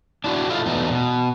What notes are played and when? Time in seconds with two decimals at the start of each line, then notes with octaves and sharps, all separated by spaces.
0.24 D4 E4 F#4
0.49 E4 F4 A4 D#5 F5
0.66 E2 B2 A3 D#4
0.90 B2